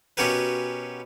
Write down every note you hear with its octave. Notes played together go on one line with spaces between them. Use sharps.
B2 C#4 F#4 G4 A#4 B4